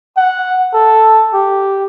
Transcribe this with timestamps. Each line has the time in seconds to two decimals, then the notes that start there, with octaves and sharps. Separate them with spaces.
0.17 F#5
0.74 A4
1.34 G4